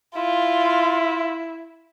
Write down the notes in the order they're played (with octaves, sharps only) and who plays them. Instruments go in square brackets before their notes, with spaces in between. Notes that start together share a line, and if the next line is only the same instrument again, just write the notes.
[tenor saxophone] E4 [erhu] F4